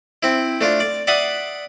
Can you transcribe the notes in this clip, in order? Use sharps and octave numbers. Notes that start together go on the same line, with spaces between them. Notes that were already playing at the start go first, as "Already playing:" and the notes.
C4 E4
A3 D4 F4
D5
D5 E5 F#5 C6 D6 D#6